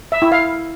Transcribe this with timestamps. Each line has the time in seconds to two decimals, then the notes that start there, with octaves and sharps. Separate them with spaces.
0.12 E5
0.22 E4
0.32 F5